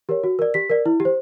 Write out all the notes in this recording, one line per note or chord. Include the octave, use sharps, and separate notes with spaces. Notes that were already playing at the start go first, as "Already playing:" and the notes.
G4 A#4 C#5
F#4
A#4 D5
G4 B6
A#4 D5
E4
G4
C5